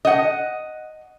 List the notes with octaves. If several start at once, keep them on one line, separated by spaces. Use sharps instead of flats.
D#5 F#5